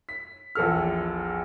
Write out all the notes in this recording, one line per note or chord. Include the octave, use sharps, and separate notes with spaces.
B6
A#1 E2 A4 F6